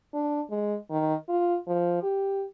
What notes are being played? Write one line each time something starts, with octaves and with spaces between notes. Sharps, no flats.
D4
G#3
D#3
F4
F3
G4